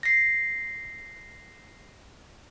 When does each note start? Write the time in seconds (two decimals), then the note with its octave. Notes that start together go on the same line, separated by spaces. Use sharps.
0.03 A#6 C7